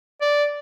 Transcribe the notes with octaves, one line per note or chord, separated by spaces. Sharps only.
D5